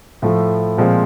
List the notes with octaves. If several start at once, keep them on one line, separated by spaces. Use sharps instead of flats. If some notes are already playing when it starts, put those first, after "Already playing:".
A2 F3 A3
A#2 F3 G#3 C4